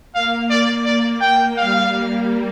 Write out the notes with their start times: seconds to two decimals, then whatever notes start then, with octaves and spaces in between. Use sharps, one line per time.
0.14 A#3 F5
0.50 A#3 D5
0.85 A#3 D5
1.21 G5
1.57 G3 F5
1.92 A#3